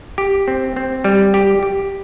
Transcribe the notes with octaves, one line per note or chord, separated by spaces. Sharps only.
G4
C4
C4
G3
G4
G4